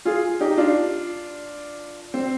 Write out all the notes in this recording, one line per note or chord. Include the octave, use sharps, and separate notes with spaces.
F4 G#4
D#4 G4
D4 F4
C4